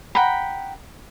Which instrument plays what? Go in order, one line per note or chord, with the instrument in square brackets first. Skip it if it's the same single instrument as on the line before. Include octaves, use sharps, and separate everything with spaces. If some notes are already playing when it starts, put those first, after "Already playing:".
[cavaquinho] F#5 G5 A#5 B5